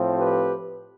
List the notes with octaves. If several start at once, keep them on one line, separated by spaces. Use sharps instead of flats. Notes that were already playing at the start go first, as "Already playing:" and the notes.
Already playing: A2 F3 C4
G4 B4